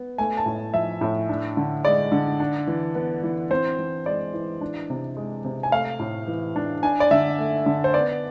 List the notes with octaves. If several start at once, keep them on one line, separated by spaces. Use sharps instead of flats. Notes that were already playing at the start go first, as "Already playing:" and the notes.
Already playing: B3
A3 G#5
A5
A2
F3 E5
A2
D4
D3
G#3 D5
D3
D4
E3
B3
E3
C4 C5
E3
G#3 D5
E3
D4
C3
G#3
C3
G#5
A3 F5
A2
E3
D4
D4 G#5
D5
D3 E5
A3
D3
C5
B3 D5